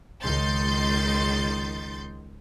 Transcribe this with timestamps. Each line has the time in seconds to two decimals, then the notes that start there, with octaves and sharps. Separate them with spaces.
0.23 C#2 D#3 C6 G6 A6